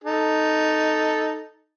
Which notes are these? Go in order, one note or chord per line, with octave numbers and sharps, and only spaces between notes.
D#4 A4